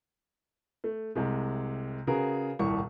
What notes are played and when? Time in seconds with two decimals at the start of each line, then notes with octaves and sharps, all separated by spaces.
0.84 A3
1.15 C2 C3 G#3
2.07 C#3 F#4 G#4 A#4 B4
2.59 D#1 C2 A2 G3 C#6